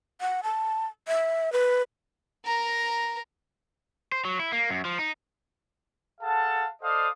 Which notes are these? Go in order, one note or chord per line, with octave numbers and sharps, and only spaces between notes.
F#5
A5
E5
B4
A#4 A#5
C5
F#3
E4
A#3
F#2
F3
D#4
G#4 A4 F5 F#5 A5
A4 C5 D5 D#5 F5 D#6